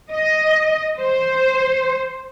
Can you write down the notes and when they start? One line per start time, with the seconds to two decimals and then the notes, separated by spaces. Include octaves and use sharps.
0.11 D#5
0.99 C5